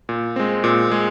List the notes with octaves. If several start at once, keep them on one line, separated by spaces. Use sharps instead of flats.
A#2
G#3 C4
A#2
G#3